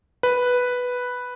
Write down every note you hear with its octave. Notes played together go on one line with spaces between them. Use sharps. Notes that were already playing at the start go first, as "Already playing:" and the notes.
B4